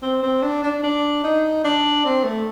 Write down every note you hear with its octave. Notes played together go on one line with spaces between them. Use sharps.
C4
C4
D4
D4
D4
D#4
D4
C4
A3